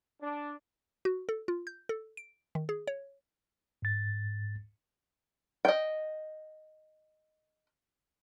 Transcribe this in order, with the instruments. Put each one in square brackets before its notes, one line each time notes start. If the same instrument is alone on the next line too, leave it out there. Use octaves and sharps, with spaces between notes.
[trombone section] D4
[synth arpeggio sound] F#4
A4
F4
G6
A4
D7
D#3
G#4
C#5
[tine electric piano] G#2 A6
[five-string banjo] D#5 G5